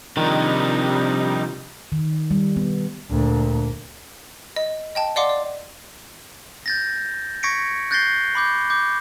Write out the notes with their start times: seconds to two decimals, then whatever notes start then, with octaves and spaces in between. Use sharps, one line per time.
0.17 C3 D#3 F3 G3 D4 D#4
1.92 D#3
2.31 G3
2.56 B3
3.11 D2 A#2
4.56 D#5
4.95 D#5 G5 A5
5.16 D5 D#5 F5 F#5 C6 D6
5.29 D5
6.66 G6 A6 A#6
7.43 C#6 G#6 A#6 B6 C#7 D7
7.91 F#6 G6 A6 A#6 C7 G7
8.35 B5 D6 G6
8.70 D6 G6